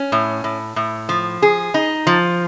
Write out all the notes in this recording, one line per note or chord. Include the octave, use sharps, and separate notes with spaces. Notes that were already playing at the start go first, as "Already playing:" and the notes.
Already playing: C#4
A2
A2
A2
F3
G#4
D#4
F3